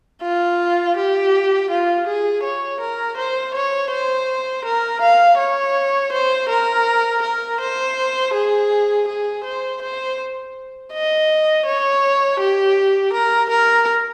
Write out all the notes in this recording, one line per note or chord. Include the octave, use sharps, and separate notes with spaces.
F4
G4
F4
G#4
C#5
A#4
C5
C#5
C5
A#4
F5
C#5
C5
A#4
A#4
C5
G#4
G#4
C5
C5
D#5
C#5
G4
A#4
A#4